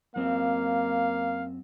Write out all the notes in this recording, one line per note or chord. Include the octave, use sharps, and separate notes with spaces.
F#2 A#3 C4 F5